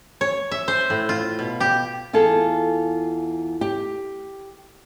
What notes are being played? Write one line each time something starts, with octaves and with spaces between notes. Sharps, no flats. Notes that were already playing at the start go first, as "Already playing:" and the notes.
C#5
E5
C5
A2
F4
B2
G4
E2 F4 G#4 A4
G4